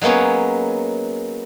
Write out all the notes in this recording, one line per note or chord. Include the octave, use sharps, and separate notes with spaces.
F#3 G#3 A#3 B3 C#4